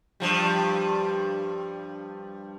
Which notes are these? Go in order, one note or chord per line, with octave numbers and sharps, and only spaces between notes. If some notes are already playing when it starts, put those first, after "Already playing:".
G2 F3 G3